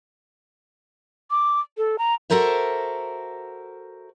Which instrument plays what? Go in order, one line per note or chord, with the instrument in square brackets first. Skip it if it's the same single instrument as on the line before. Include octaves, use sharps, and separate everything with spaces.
[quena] D6
A4
A#5
[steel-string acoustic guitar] F#4 G4 A4 A#4 C5 E5